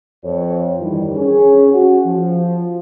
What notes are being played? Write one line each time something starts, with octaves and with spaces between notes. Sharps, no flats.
F2 C#5
G2 D#3 E3 G3
C#4 G#4
F#4
F3